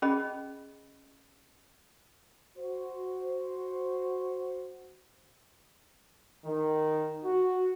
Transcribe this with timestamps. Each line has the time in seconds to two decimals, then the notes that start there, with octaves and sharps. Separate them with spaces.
0.02 C#4 G#4 D#5 B5
2.58 F#4 C5
6.46 D#3
7.25 F#4